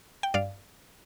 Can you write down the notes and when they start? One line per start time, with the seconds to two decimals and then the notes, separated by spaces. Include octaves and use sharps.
0.23 G5
0.34 G2 D5 F5